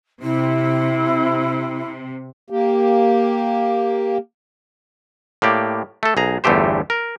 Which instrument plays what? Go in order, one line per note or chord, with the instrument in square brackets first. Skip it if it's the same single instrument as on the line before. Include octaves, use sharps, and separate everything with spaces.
[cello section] C3 [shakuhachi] E4
[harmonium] A#3 G4
[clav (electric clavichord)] A2 A#3 G4 D5
A3 A4
B1 G#4 A#5
G1 E2 G2 A3 G4 C5
A#4